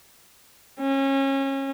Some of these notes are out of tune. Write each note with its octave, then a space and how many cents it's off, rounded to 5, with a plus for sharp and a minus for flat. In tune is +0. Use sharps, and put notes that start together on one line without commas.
C#4 -30